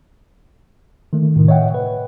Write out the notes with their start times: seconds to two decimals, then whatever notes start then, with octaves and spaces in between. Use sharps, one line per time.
1.13 D#3 A3
1.36 A2 C3 D#3
1.48 C#5 D#5 E5 F#5 G5
1.74 B4